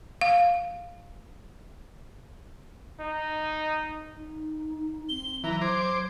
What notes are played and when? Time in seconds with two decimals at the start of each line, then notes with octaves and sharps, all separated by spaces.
0.21 F5
3.00 D#4
4.16 D#4
5.09 C4 G7
5.44 E3 F#3 A#5
5.61 C5 D6 G#6